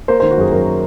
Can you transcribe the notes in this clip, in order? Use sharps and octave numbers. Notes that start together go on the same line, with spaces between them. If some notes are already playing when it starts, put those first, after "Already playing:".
A#3 C5
D#3 C5
F#4
F#2 G#4
F#2 A#4